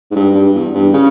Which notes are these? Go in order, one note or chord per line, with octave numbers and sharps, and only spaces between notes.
G#2
G2
G2
E2
G2
C#3